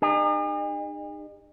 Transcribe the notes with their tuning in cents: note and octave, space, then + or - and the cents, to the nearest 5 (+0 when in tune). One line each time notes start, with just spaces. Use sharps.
D#4 -40 G#4 -45